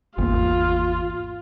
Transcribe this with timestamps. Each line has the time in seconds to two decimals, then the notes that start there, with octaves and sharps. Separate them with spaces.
0.18 G#1 E2 A#3 F4